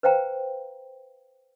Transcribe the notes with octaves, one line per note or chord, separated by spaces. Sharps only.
B4 C5 F5 G5 A#5